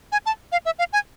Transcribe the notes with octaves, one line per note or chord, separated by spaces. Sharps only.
G#5
A5
F5
E5
F5
G#5